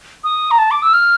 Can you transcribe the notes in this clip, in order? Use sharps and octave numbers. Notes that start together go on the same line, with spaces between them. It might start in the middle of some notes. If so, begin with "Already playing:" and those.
D#6
A#5
A5
D6
E6
F6